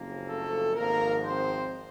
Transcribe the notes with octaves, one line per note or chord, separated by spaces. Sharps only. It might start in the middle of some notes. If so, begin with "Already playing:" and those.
Already playing: F#1 F2 C#3 F3 A#3
A3 A4
G#1 G#2 F3 A#3 A#4
C4 C5